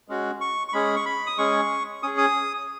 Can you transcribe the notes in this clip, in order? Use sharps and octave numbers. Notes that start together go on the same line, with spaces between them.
G#3 C#4 F#4
C#6
C#6
G#3 C#4 G#4 B5
C#6
B5
D#6
G#3 C#4 G#4 C#6
C#4 G#4 D#6
D#6